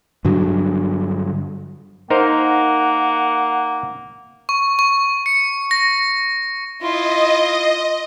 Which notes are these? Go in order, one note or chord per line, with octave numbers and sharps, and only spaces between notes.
G2 D3 F#3
A#3 D#4 A#4 C5 F#5
C#6
C#6
C#7
A#6
E4 F4 D#5